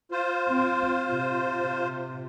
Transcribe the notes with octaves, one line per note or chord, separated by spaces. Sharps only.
F4 C5
C4
C3